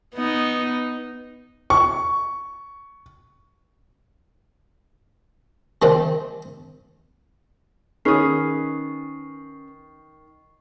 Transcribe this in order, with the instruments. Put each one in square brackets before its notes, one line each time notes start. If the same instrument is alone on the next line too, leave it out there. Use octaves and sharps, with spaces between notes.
[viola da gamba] B3 D#4
[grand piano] C#6
[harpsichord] C3 D#3 G3 C4
[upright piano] D#3 D#6 [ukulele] C#4 G#4 B4 [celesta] C#6 C7